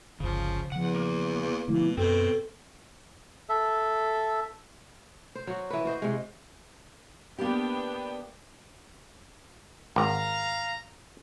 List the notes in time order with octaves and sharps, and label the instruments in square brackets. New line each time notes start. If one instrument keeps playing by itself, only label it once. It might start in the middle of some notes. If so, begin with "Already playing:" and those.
[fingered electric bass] G1 D2 [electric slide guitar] C#3 [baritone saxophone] F3
[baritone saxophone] E2 [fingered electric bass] C#3 F3 [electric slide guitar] F#5
[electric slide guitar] A#3
[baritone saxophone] B2 [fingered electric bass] D3 F3 A3 [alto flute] E4
[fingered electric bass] F#2 [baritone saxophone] B2 [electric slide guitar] C4 C5 [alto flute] A4
[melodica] A4 E5
[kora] C5
F#3 F#4
E3 B4
F#4 C5 D#5
C3 G#3
[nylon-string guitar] A#3 G4 [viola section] B3 D4 G5
[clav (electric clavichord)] G#1 [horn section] F5 A#5